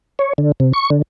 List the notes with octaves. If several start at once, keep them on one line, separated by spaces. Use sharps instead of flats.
C#5
D3
C3
C#6
D3